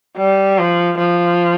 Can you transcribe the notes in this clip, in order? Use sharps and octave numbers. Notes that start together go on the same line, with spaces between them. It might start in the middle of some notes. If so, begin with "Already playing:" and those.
G3
F3
F3